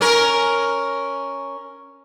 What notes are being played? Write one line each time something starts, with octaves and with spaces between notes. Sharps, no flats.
C#4 A#4